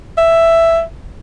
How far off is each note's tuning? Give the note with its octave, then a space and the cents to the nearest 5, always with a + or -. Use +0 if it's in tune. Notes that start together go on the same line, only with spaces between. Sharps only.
E5 +5